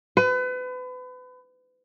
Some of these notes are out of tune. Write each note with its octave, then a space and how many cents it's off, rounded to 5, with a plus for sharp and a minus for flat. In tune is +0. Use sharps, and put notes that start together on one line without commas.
B4 +35